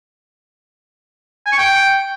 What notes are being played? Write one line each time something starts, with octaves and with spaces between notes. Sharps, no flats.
G#5
C#6
G5